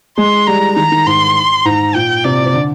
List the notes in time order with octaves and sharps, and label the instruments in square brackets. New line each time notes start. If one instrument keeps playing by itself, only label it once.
[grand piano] G#3 [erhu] C6
[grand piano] G3 [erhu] A#5
[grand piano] D#3 [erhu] A#5
[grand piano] D#3
[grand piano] G#2 [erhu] C6
[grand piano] G#2 [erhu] A#5
[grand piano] A#2 [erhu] G5
[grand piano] C3 [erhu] D5
[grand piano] C3
D3